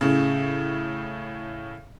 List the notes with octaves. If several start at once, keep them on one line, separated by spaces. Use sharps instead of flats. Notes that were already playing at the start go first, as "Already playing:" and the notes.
A2 C#3